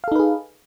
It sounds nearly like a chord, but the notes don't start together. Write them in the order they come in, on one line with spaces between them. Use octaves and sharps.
F5 A4 D#4 B4 G#4